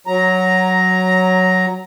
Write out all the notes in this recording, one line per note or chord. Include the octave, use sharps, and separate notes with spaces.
F#3 A#5